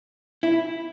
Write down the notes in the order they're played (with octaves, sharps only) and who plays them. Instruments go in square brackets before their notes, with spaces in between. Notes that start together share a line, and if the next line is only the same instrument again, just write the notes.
[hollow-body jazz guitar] E4